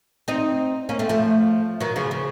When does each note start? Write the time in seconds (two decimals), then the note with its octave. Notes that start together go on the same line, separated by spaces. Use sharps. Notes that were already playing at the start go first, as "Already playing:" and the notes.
0.28 C4 D#4
0.89 A#3 C#4
0.99 A3 C4
1.09 F3 A3
1.80 D#3 F#3
1.96 C#3 F3
2.11 C#3